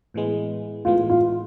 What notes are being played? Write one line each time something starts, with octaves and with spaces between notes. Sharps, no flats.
A2 E3 G#3 B3
A2 E3 G#3 B3 F4
F4